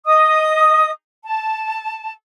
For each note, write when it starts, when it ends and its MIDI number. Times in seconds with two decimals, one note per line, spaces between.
0.06 0.91 75
0.06 0.91 87
1.24 2.12 81